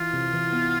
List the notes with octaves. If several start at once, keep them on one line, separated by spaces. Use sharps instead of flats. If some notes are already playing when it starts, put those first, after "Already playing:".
Already playing: E3 F4
C3
E3
B3